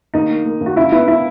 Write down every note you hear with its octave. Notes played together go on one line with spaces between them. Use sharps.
D#2 D#4
A#3
A#3
D#2
F#4
C#2 E4
B3 E4
B3 E4